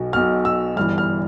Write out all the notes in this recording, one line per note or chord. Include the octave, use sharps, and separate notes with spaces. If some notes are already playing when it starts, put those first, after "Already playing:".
Already playing: B1 B2
B1 B2 F6
E6
G1 G2 E3 F6
F6